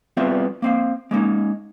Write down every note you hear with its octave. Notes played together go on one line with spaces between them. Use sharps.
G3 B3 C4 F4 G#4 E5
A#3 C4 F5
G#3 A#3 C#4 D#4